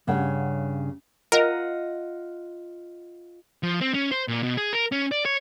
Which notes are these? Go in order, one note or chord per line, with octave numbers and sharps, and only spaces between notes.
G2 C#3 C#5 F#5 G5
F4 A#4 D#5 F#5
F3
C4
C#4
C5
A#2
B2
G#4
A#4
C#4
D5
C#5